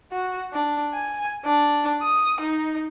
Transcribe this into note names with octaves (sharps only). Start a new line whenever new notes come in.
F#4
D4
G#5
D4
D#6
D#4